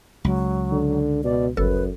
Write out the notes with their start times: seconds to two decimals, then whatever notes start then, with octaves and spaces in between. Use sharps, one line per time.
0.25 C#2 F#3
0.72 D3
1.24 B2 D5
1.57 G1 F#2 A4 B4